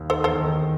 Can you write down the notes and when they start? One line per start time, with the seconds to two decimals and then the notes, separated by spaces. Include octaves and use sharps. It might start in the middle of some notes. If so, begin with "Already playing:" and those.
Already playing: D#2
0.10 D#4 A4 C5
0.24 E2 A4 C5
0.40 D#3